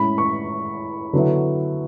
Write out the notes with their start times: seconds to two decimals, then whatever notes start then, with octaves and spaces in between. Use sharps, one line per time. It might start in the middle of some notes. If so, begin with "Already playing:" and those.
Already playing: A2 G#3 C#4 E4 B5
0.18 C#6
1.13 D3 F#3 B3 E4